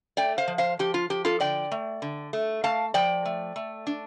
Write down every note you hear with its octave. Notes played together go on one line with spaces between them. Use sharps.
A3 D5 G5
C5 F5
F3
C5 F5
F3 G4
F4
F3 G4
F4 A4
D3 D5 G5
A3
D3
A3
A3 F5 A5
F3 D5 G5
A3
A3
D4